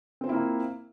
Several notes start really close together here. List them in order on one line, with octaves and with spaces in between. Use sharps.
C4 C5 F4 E4 A#3